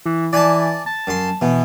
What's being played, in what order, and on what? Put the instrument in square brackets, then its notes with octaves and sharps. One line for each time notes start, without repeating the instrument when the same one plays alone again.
[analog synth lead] E3
[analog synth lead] E3 [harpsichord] D5 G#5 A5
[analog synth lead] A5
[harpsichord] F#2 C6
[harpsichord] B2 [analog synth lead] E3